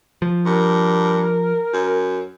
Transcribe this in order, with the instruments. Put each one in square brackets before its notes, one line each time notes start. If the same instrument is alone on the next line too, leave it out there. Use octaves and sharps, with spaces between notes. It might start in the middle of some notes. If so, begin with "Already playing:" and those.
[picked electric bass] F3
[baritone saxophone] G2 [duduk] A#4
[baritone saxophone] F#2